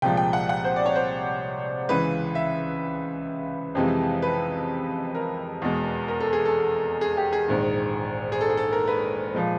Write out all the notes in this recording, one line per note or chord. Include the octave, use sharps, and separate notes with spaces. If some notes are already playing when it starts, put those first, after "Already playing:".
C2 A#2 F3 G#3 G5
G5
F#5
F#5
C5
D5
C#5
C5
C#2 C#3 E3 G#3 B4
E5
F2 C3 E3 G#3
B4
A#4
E2 B2 G#3
A#4
A4
G#4
A4
G#4
G4
G#4
A#1 G#2 D#3
G#4
A4
G#4
A4
A#4
B4
A#2 F3 G#3